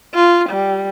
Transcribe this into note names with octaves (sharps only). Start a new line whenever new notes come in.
F4
G3